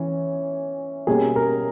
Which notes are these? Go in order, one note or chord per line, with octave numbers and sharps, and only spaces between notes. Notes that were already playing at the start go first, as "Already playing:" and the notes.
Already playing: E3 C#4
B2 G3 A#3 C#4 G#4
A#4